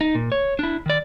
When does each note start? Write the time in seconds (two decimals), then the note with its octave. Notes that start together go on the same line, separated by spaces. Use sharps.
0.01 D#4
0.15 A#2
0.32 C#5
0.59 D4 E4
0.86 D#3 D5